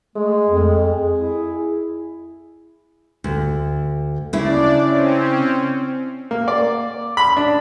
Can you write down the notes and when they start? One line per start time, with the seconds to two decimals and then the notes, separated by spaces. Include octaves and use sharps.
0.16 G#3 A3
0.48 F2
0.78 G#4
1.16 E4
3.24 D2
4.33 C#3 D4 E4 D5
4.82 C4 C#4
6.31 A#3
6.48 D5
7.17 B5
7.37 D4